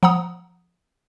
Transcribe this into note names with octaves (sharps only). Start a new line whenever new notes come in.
F3 F#5 A#5 D#6